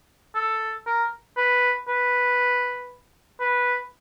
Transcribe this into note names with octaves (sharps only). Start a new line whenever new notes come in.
A4
A#4
B4
B4
B4